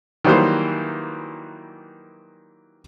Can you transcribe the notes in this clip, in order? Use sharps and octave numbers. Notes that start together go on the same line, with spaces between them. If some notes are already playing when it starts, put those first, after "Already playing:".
D#3 E3 F#3 G3 A#3 C5